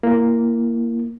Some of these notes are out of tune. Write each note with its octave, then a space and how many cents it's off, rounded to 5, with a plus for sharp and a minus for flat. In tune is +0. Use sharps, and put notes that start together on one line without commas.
A#3 +0 E4 +25